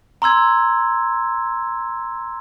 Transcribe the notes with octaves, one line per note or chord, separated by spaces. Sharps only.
A#5 C6 E6 G#6